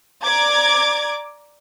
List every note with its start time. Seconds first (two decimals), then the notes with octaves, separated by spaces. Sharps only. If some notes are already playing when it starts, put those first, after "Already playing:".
0.23 D5 A#5 D6 G#6